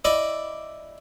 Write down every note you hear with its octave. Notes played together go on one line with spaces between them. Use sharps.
E4 D5 D#5 D6